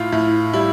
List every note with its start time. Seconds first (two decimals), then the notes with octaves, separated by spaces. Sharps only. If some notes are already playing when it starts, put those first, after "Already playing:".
Already playing: A2 F4
0.12 A2
0.54 G3 E4